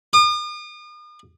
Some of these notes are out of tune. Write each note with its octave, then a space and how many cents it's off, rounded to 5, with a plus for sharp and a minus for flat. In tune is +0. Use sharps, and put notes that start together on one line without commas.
D#6 -45